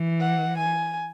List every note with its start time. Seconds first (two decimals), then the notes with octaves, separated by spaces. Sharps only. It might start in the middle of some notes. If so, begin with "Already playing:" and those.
Already playing: E3
0.20 F#5
0.58 G#5